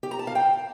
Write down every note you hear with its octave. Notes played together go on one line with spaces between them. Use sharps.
G4
A#5
A5
F5
G5